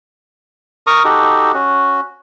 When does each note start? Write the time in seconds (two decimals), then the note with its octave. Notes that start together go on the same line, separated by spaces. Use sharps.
0.87 A#4 A#5 C#6 D#6
1.04 D#4 F#4 G4 A4
1.54 C#4 F#4